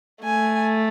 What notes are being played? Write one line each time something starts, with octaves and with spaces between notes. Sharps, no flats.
A3 G#5